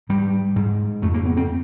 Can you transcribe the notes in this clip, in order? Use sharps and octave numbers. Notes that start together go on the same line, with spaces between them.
G#2 G3
G#2
F2 C#3 A3
A#3
B3
C4